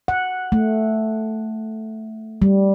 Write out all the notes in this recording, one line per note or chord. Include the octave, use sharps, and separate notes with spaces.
F#5
A3
G3